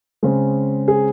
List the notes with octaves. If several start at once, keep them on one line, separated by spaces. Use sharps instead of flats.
C#3 G#3 C4
G#4